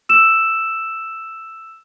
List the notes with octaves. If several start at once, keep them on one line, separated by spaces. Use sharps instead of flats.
E6 E7